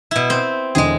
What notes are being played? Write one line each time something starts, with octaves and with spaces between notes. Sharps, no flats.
B2 E4
C4
E1 D3 G#3 G#4 G5